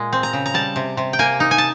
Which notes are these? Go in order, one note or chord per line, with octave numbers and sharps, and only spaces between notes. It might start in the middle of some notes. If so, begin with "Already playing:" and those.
Already playing: A#2 G#3
C4
A#5
C#3
A#5
G3 A5
C3
C3
G5
A#3 G#5
D#4
G#5
A5